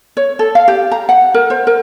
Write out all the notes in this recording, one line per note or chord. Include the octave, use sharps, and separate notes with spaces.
C#5
A4
F5
G4
A#5
F#5
A#4
C5
A#4